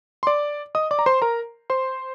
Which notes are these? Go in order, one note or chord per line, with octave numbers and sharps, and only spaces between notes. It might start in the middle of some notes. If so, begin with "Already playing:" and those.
C6
D5 D6
D#5 D#6
D5 D6
A#5
C5 C6
A#4 A#5
C5 C6